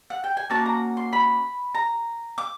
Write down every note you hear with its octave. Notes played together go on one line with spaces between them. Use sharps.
F#5
G5
G#5
A#3 C#4 F#4 A5
A#5
C6
B5
A#5
D6